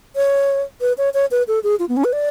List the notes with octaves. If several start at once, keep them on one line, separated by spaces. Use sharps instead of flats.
C#5
B4
C#5
C#5
B4
A4
G#4
F4
B3
C#4
B4
D5